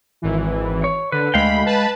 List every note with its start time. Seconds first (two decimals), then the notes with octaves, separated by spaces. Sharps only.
0.22 G#1 E3
0.84 C#5
1.12 D3 B4
1.34 D2 G#3 F5 G5 B5
1.66 B4 A5 B5